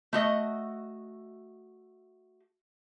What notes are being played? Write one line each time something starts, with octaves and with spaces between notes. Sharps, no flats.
A3 F#4 D#5